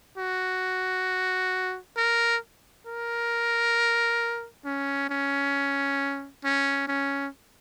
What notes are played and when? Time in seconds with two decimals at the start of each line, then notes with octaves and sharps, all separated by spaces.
0.18 F#4
1.97 A#4
2.87 A#4
4.65 C#4
5.10 C#4
6.44 C#4
6.88 C#4